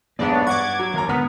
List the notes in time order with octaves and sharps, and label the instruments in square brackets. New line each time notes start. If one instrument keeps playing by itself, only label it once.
[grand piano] B1 E2 G#2 [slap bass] E3 A#3 [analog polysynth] B3 D4 D5
[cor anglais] C#5
[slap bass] G2 [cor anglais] F#5 [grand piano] C#6 [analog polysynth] D6 G#6
[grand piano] F#3
[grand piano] F#1 D#2 A#5 [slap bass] D#3 [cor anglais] A#4
[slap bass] G#2 D3 [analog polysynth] B3 [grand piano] D#6 F6 B6